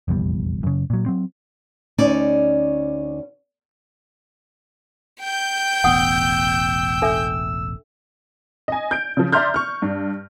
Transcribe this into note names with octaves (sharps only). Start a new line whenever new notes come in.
F1 A#1 E2 G3
F#2 C#3
A#2 F#3
F#3 C4
D2 C#4 D#4 D5
G5 G6
E1 A1 B3 F#5 D#6 E6
D4 A4 E5
D#5 G#5
G6 D7
C#3 F3
D5 E5 A#5 C6 F6 G6
C#6 F6
G2 D4